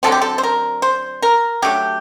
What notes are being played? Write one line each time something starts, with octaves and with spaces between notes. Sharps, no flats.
D3 F#3 A3 C4 A4
G4
A4
C5
A#4
C5
A#4
F#3 A3 D4 G4